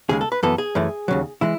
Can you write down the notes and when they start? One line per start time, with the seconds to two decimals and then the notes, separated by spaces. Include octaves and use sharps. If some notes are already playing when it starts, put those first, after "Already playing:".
0.09 D#2 C#3 G#3 G#4
0.21 A4
0.32 B4
0.43 F#2 E3 B3 A4
0.58 G#4
0.75 F#2 E3 A3
1.08 D#2 C#3 F#3
1.41 E3 G#3 E4